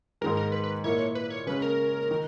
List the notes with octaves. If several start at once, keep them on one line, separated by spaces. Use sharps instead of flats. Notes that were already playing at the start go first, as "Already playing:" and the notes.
G#2 D#3 G#3 A#4
A#4
B4
B4
A#2 A#3 E4 C#5
B4
C#5
C#3 G#3 C#4 B4
A#4
D#3